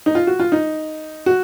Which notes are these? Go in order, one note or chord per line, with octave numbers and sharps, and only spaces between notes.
D#4
F4
F#4
F4
D#4
F#4